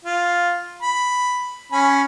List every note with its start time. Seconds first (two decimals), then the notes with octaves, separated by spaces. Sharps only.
0.05 F4
0.83 B5
1.72 C#4 G#5 B5